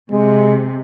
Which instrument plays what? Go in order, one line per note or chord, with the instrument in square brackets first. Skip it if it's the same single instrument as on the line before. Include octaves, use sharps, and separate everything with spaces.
[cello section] C3 [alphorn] G#3